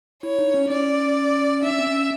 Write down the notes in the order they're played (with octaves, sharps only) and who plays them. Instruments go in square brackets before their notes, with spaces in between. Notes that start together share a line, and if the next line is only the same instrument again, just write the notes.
[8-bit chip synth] E4 [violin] C#5
[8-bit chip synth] D#4
C#4
[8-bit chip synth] C#4 [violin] D5
[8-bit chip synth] D4 [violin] E5
[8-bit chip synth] C#4
C4
C#4